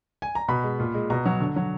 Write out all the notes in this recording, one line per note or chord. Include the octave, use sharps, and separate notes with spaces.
G#5
A#5
B2 B5
G#3
A#2
G#3
B2 A#5
F#3
D3
F#3